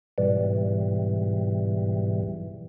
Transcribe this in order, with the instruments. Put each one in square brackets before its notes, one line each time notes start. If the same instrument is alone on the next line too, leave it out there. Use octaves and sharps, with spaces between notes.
[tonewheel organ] G#2 B2 E3 G3